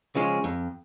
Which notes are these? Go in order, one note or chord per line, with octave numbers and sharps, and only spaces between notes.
C#3 F3 G#3 C#4
F2